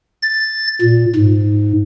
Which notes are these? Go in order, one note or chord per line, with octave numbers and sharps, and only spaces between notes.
A6
A#2
G#2